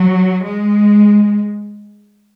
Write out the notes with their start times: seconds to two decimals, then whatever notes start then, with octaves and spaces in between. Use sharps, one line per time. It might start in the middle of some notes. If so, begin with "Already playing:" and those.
Already playing: F#3
0.44 G#3